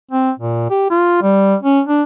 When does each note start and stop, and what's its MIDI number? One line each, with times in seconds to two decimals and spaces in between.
0.11 0.31 60
0.39 0.67 46
0.70 0.86 67
0.90 1.20 65
1.22 1.55 55
1.63 1.81 61
1.87 2.03 62